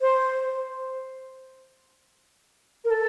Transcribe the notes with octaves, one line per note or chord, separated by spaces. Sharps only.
C5
A#4
A4